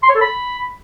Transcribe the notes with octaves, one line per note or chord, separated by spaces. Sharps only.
C6
C#5
A4
B5